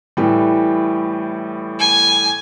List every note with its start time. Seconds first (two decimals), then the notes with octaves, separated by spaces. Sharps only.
0.17 A2 E3 G3
1.80 G#5